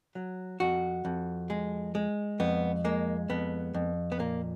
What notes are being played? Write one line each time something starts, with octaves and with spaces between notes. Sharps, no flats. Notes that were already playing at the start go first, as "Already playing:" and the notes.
F#3
F2 F#4
F2
G#3
G#3
F2 B3
G#3 A#3
F2 B3
F2
B3
A#2 A#3